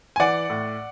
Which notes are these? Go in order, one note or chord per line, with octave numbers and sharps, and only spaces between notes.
G#5
E3 D5 F#5
A2